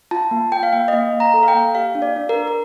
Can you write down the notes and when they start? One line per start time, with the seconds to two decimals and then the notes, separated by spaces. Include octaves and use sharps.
0.11 F4 A5
0.31 A#3
0.52 A#3 G5
0.63 F5
0.73 A#3 G5
0.88 D#5
0.93 A#3 F5
1.13 A#3
1.20 A#5
1.34 A4
1.43 F5
1.48 G5
1.55 A#3
1.75 G4 F5
1.95 D4
2.02 D5
2.16 D4
2.29 A#4
2.36 D4
2.48 A#4